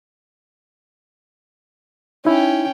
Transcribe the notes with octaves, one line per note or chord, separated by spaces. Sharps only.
C#4 D#4 E4 G5